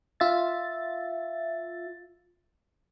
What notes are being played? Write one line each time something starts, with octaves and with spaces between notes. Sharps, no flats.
F4 E5 A6